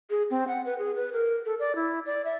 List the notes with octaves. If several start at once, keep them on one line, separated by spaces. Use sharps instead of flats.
G#4
C4
F#5
B4
G#4
B4
A#4
A4
D5
E4
D5
E5